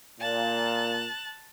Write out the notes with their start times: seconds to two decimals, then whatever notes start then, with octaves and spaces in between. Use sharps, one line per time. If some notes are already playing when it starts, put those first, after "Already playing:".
0.20 A#2 A5 F#6